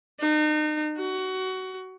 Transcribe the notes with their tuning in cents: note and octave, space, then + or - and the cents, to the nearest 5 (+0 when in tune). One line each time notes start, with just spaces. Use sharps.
D#4 -35
F#4 +20